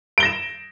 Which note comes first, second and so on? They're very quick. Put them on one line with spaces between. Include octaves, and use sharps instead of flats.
D7 G7 A#6 E7